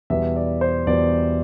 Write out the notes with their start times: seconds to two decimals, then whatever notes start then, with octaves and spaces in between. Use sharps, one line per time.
0.10 E2 B2 G3 B3 E5
0.36 D5
0.61 C5
0.87 E2 B2 G3 B3 D5